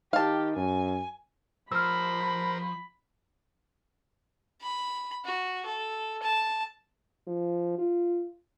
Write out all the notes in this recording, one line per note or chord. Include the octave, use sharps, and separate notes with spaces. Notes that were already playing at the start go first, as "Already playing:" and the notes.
D#3 G4 F5 A5
F#2 G#5
F3 A#4 C5 B5 E6 F6
B5
F#4
A4
A5
F3
F4